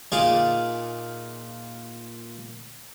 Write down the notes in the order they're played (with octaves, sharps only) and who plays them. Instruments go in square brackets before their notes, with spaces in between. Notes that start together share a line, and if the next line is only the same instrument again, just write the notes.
[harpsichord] A#2 D#4 G#4 D5 F5